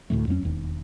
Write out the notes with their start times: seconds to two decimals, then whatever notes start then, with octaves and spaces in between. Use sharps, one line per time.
0.10 D2 A2 G3 A3
0.27 F2 F#3 A#3 C#4
0.43 E1 D#2